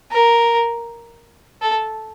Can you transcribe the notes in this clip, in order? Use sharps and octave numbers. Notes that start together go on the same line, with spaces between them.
A#4
A4